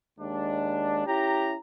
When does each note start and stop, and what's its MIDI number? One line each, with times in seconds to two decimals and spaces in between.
0.20 1.01 39
0.20 1.01 56
0.20 1.01 62
1.06 1.56 61
1.06 1.56 64
1.06 1.56 67
1.06 1.56 82